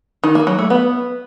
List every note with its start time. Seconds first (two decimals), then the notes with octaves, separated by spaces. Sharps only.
0.24 D#3
0.35 A#3
0.47 F#3
0.59 A3
0.70 B3